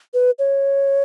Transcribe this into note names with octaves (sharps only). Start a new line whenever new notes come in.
B4
C#5